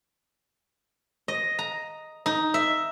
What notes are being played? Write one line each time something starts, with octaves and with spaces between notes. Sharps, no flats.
D#5
A#5
D#4
E5